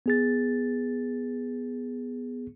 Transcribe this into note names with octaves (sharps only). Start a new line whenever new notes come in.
B3 G#4 A6